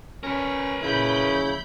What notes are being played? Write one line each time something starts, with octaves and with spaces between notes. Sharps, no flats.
C#4 A#4 B4
A#1 C#3 E4 B5 G6